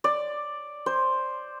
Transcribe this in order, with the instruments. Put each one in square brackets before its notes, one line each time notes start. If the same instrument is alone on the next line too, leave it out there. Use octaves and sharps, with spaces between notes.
[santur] D5
C5